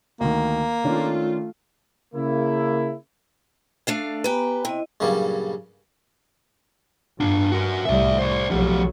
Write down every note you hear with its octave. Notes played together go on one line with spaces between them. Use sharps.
D2 D#3 A#3
D#3 A3 C#4 D4 F4
C#3 A#3 E4
A3 D4 F5
B3 G4 B4 G#5 A#5
C3 E4 D#5
G2 A#2 C#3 F#3 G3
G2 D4 F4
F#4 A#4
C2 A2 G3 D5 E5
C5 D5
B1 F3 F#3 G4